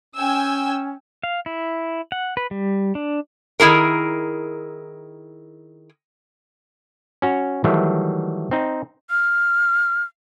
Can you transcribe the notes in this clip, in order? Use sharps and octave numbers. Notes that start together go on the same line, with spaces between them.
C#4 G5 G#5 E6
F5
E4
F#5
B4
G3
D4
D#3 G#3 E4 G#4 A#4
C#4 F#4 C#5
D#3 E3 F#3 G3 A3
C4 D#4
F6